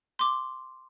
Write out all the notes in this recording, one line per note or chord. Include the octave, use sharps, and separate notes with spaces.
C6 D6